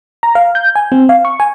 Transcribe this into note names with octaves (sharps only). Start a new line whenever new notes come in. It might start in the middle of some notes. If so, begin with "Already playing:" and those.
A#5
F5
G6
G#5
C4
F5
C#6
G#5